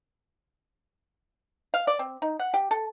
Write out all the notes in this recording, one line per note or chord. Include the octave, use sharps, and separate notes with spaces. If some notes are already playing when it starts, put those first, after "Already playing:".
F5
D5
C4
D#4
F#5
G4
A4